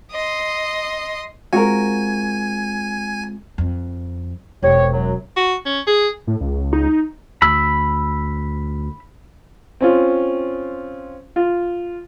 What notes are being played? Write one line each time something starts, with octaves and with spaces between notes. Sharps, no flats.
D#5 C6
G#3 C4 F4 F#4 A#4 G#5
F2
E1 C2 G4 C#5
F#2 F#3
F#4
C#4
G#4
A2
C#2
D#4
D2 B5 E6
C4 C#4 F4
F4